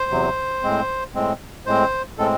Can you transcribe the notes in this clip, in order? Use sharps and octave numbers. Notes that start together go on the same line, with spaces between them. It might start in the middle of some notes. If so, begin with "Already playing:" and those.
Already playing: C5
E2 C3 F#3
A2 G#3 C4
A2 G#3 C4
A2 G#3 C4 C5
A2 G#3 C4 A4